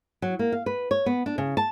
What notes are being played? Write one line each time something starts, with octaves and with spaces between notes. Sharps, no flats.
F#3
A#3
F5
B4
C#5
B3
D4
C#3
A5